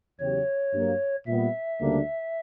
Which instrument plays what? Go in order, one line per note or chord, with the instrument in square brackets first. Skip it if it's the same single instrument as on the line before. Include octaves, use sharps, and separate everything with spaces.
[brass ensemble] E2 C#3 F#3 C#4 G4 [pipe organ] C#5
[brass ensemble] G2 F#3 A#3
[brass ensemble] A#2 G3 B3 [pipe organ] E5
[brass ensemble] D2 C#3 G3 A#3 D4